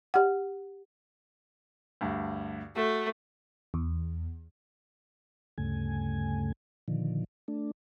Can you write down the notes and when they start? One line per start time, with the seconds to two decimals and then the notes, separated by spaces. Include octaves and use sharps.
0.14 G4 F#5
2.01 D2 G2
2.76 A3 F#4
3.74 E2
5.58 D2 G2 C#3 A3 G#5
6.88 A#2 D3 D#3 F3
7.48 A3 D4